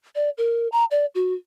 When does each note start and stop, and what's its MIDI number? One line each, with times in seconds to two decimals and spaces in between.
0.15 0.30 74
0.38 0.68 70
0.72 0.84 82
0.91 1.06 74
1.15 1.34 66